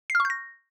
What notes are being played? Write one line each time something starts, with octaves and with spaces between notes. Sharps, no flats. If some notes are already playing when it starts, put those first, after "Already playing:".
C7
F6
C#6
G6
A#6